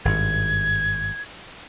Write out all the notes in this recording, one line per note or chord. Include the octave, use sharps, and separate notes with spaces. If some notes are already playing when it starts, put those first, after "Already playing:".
G#1 G2 G#6